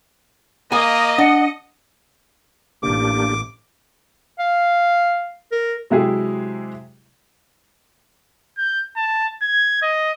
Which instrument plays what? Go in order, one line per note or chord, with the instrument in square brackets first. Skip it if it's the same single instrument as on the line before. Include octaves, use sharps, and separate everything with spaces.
[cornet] A#3 [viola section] D#5 [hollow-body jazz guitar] G#5
[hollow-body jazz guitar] D4 [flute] F#5
[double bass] A1 [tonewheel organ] A#3 D4 G4 [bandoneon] D6
[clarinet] F5
A#4
[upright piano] C3 F#3 G#3 E4 G4 G#4
[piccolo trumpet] G6
A5
G#6
D#5